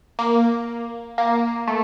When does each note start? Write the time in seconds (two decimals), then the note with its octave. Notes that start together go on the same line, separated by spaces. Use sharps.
0.19 A#3
1.18 A#3
1.67 A3